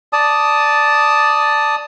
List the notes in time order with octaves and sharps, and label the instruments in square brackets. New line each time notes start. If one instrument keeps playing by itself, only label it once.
[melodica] D5 A5 D#6